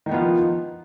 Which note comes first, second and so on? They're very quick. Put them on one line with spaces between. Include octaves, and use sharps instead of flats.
D#3 D#4 B3 F4 F3